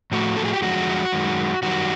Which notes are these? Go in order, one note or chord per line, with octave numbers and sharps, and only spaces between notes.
A2 F3 A3 F#4
A4
G#4
G4
F2 D3 F3 G#3 F#4
F#2 D#3 G#3
F#2 D#3 G3 F#4